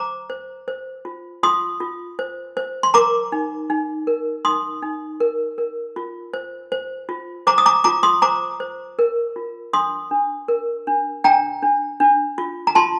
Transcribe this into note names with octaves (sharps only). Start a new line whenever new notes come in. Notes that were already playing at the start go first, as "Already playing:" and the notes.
Already playing: C5 A#5 D6
C5
C5
F4
F4 C6 D#6
F4
C5
C5
C6
A#4 A#5 D6
D#4
D#4
A#4
D#4 C6 D#6
D#4
A#4
A#4
F4
C5
C5
F4
C5 A#5 D6
D#6
A#5 D6
F4 A#5 D6
C6 D#6
C5 A#5 D6
C5
A#4
F4
D4 C6 D#6
D4
A#4
D4
D4 G5 A#5
D4
D4
F4
A#5
F4 A5 C6